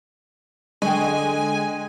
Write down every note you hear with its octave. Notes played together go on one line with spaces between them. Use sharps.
D3 G#3 G5 G#5 C#6